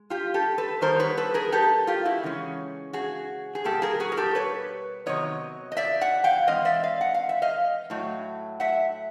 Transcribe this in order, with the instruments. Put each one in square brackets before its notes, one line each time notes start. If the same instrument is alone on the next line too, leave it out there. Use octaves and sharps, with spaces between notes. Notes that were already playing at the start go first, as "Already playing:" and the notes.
Already playing: [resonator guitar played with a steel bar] G#3
F4 G4
G4 A4
A4 B4
D#3 G3 B3 A#4 C5
B4 C#5
A4 B4
G#4 A#4
G4 A4
F4 G4
E4 F#4
C#3 E3 G#3 C#4
F#4 G#4
G#4
B2 G3 A#3 G4 A4
G#4 A#4
F#4 G#4
A#4
G4 A4
B4 C#5
C3 D#3 F#3 B3 C#5 D#5
D#5
D5 E5
E5 F#5
F5 G5
E3 G#3 C4 D#5 F5
D5 E5
D#5 F5
F#5
F5
E5
D#5 F5
A2 F#3 A3
E5 F#5